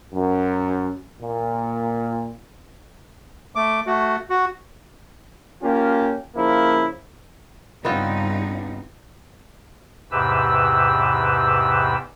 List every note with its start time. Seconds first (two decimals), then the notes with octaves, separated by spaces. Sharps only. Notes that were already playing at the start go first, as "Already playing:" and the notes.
0.13 F#2
1.21 A#2
3.55 A3 D6
3.86 A3 F#4
4.30 F#4
5.63 A#3 C#4 F4 G4
6.36 C#3 F3 A#3 E4
7.85 G2 C#3 B3 C4 D#4 F4
10.11 E2 G#2 C3 G4 B4 E6